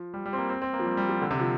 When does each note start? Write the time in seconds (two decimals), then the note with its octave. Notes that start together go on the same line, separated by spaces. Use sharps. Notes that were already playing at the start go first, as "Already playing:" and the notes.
Already playing: F3
0.14 G3
0.26 G3
0.33 C4
0.38 A#3
0.49 C4
0.62 C4
0.73 A#3
0.80 F3
0.86 G3
0.97 G3
1.09 F3
1.22 D3
1.31 C3
1.39 F3